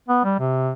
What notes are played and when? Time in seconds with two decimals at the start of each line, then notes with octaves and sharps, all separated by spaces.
0.09 B3
0.24 G3
0.39 C3